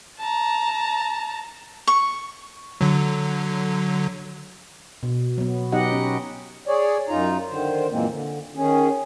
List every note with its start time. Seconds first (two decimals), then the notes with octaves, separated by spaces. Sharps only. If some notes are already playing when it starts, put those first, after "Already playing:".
0.20 A5 A#5
1.87 C#6
2.81 D3 F#3
5.03 B2
5.38 F#3 B3
5.72 F#3 B3 D#4 G4 D#5 F#5
5.92 C#4
6.68 G#4 C#5 D5
7.09 F#2 D#4 F4 A#5
7.49 D3 D#3 C5
7.91 F#2 A#2 E3 G#3 A#3 C4
8.07 D3
8.55 D#3 C#4 G#4